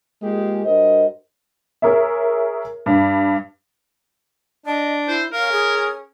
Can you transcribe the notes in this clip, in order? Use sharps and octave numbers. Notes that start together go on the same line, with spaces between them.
G#3 A#3 F4 G4 G#4
G2 F#4 A#4 C5 D#5
G#4 A#4 C#5 E5
G2
D4 D#5
E4 C5
C#4 A#4 F5
G#4